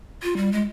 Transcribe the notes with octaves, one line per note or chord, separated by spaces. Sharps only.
F4
G3
G#3